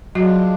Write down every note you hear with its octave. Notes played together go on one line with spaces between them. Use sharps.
F3 F#3 G#3 D4 F#4